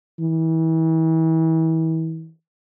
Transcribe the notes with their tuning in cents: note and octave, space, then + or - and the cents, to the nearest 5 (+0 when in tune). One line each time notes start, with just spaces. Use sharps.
E3 -35